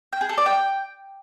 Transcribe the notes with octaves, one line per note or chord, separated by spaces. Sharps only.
G5
G#4
A4
D5
G5